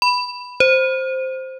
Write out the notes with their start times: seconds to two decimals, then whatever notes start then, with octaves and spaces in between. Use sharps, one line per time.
0.02 B5
0.60 C5